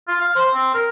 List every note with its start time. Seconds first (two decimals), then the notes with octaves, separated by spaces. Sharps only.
0.08 F4
0.21 F5
0.35 C5
0.54 C4
0.74 A#4